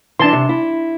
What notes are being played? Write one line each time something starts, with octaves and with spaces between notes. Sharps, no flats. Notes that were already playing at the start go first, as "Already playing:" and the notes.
E3 D4 A5 C6
C3
E4